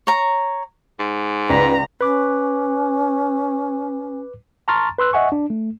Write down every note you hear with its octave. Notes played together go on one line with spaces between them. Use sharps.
C#5 A#5
G#2
C#2 B4 D5 A#5 B6
C#4 B4 D6 F#6
A5 A#5 C6 C#6 F6 A6
B4 C6 E6 F#6
D#5 E5 F#5 G#5 C#6
D4
A3